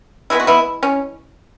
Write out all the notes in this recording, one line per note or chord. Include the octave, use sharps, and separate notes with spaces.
E3 G#3 B3 E4
F#4
B3 E4
C#4